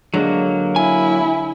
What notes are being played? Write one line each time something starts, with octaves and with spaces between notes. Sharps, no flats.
D3 F#3 G#3 A#3
E4 G#5